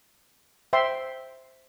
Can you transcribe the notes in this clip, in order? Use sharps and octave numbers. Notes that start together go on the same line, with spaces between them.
C5 E5 G5 C6